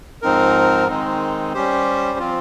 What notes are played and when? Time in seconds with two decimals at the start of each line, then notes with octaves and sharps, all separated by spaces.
0.22 G#2 F3 C4 D#4 A#4
0.88 D#3 G#3 C4 D#4
1.54 G3 C#4 G4 C5
2.19 F3 C4 F4